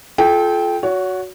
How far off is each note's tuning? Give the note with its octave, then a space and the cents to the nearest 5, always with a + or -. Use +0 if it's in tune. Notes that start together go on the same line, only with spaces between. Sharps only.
F4 -5 A4 -35 G5 +0
F#4 -5 C#5 +30